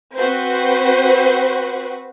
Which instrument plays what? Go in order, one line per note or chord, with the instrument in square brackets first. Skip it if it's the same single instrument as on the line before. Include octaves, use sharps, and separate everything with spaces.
[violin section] C4 F#4 B4 C5